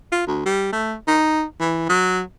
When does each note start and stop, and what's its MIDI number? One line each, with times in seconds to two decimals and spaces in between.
0.12 0.26 65
0.27 0.44 38
0.45 0.71 55
0.72 0.95 57
1.07 1.43 63
1.60 1.85 52
1.89 2.20 54